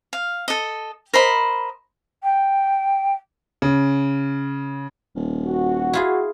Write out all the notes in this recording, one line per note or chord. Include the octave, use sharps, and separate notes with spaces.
F5
A4 D#5
A#4 C5 D#5 B5
G5
C#3
D#1
F#4
E4 F4 G#4